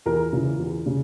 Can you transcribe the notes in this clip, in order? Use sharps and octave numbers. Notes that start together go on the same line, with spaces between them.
E2 A#4
C#3 E3
E2
C#3